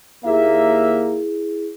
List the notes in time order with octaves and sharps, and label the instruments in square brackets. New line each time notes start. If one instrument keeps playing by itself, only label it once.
[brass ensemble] D#2 A#3 E5 [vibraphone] E4 G#4